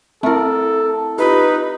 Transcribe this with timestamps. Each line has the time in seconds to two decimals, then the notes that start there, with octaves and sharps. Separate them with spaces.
0.23 A3 C4 E4 A4 A#4
1.18 D#4 F4 G4 B4